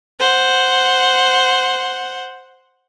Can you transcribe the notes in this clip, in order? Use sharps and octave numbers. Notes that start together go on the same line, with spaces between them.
C5 F#5